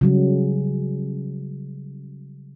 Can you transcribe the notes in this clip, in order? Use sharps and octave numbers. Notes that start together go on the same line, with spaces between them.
C#3 F#3 G3